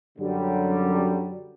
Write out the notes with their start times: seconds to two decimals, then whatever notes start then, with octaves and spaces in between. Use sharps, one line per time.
0.18 F#2 D3 F#3 G3